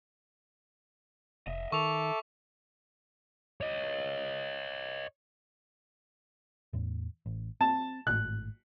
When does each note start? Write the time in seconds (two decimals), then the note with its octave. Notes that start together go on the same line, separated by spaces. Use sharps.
1.47 F1 D#5 E5
1.72 D#3 A4 E5 C#6 D6 F7
3.61 C#5 D#5
6.73 E2 A2
7.26 A1
7.61 C4 A5
8.07 G#1 A2 F#6